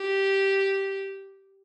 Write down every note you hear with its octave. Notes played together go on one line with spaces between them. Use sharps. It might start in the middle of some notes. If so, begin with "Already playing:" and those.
Already playing: G4